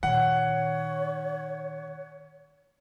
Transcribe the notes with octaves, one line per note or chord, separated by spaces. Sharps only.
A#2 D#3 C#5 F#5